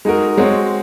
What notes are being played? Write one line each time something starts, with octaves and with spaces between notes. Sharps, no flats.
G#3 D#4 F#4 A#4
G#3 C4 F#4 C#5